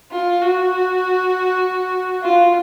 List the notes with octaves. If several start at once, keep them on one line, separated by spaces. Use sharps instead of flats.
F4
F#4
F4